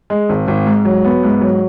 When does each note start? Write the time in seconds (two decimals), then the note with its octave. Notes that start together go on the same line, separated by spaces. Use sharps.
0.10 G#3
0.29 G#1
0.48 G#1
0.66 G#2
0.85 F#3
1.04 B3
1.23 G#2
1.41 F#3